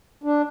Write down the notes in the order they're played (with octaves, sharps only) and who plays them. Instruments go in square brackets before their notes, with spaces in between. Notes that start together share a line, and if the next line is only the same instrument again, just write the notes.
[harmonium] D4